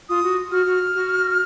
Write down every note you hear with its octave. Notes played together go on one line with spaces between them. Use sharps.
F4 D#6
F#4
F#4 F6
F#4
F#4